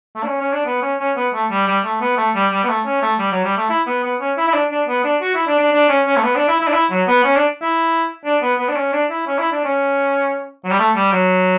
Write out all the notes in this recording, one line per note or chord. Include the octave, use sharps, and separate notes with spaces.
A3
D4
C#4
C#4
D4
B3
C#4
C#4
B3
A3
G3
G3
A3
B3
A3
G3
G3
B3
A3
C#4
A3
G3
F#3
G3
A3
E4
B3
B3
C#4
E4
E4
D4
D4
B3
D4
F#4
E4
D4
D4
D4
C#4
C#4
A3
B3
D4
E4
E4
D4
E4
F#3
B3
C#4
D4
E4
D4
B3
B3
D4
C#4
D4
E4
C#4
E4
D4
C#4
F#3
G3
A3
G3
F#3